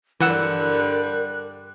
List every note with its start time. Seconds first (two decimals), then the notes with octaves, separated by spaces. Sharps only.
0.21 G2 D3 E3 G3 A#4 F#5 E6 F#6